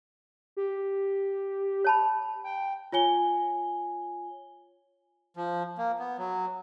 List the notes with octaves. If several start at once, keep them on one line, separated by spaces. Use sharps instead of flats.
G4
C#5 A5 B5
G5
F4 C#5 G#5 G7
F3
A#3
B3
F#3